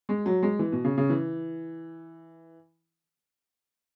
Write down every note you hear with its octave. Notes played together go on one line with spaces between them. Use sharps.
G#3
F#3
G#3
E3
B2
C#3
C#3
E3